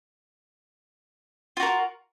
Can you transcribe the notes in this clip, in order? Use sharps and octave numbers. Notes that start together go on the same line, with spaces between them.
F4 F#4 A#4